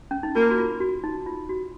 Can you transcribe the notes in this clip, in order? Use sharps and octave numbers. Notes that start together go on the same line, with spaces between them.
C#4
D#4
A#3 F4
F#4
F4
F#4
D#4
F4
F#4